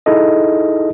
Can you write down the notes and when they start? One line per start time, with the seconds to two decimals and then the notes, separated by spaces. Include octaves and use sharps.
0.06 D#4 E4 G#4 A4 D#5